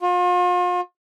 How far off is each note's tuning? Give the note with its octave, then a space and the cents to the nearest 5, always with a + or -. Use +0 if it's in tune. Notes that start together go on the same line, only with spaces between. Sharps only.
F4 +40